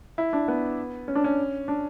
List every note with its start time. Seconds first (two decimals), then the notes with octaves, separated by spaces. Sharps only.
0.18 E4
0.33 D4
0.48 B3
1.08 C#4
1.15 D4
1.24 C#4
1.68 D4